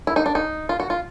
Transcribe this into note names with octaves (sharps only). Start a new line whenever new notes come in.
E4
D#4
D4
D#4
F4
F#4
F4